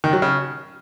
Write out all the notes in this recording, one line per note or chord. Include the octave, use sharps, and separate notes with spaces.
D#3
F#3
C#3